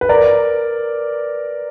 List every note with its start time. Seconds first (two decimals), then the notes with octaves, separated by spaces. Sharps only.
0.01 B4
0.09 A#4 D5